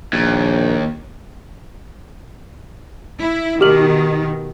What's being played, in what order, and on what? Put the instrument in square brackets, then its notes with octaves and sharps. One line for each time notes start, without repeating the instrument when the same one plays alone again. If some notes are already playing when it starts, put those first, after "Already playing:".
[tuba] A#1 [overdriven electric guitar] D#2
[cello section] E4
[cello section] B2 D#3 [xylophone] G4 F6 F#7